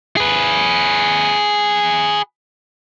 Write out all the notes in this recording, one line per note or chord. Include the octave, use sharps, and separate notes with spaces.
G#4 B4